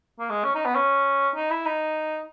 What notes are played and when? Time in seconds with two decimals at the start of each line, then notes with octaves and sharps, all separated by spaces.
0.19 A#3
0.30 G#3
0.44 C#4
0.55 D#4
0.65 B3
0.75 C#4
1.36 D#4
1.50 E4
1.66 D#4